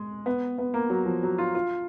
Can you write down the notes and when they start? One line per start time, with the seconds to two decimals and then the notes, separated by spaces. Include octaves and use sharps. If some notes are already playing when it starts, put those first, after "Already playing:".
Already playing: G#3
0.26 B3
0.58 B3
0.74 A#3
0.90 F#3
1.06 F3
1.23 F#3
1.38 F4
1.55 F4